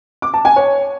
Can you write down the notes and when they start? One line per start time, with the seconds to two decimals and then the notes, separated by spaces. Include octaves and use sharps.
0.22 D6
0.34 A5
0.45 G#5
0.56 C#5